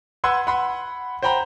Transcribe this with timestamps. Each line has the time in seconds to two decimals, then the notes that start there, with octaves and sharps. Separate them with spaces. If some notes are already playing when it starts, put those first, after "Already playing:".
0.24 B4 F#5 C6 E6 G#6
0.47 F#5 B5 C6
1.22 C5 F#5 G5 A#5 B5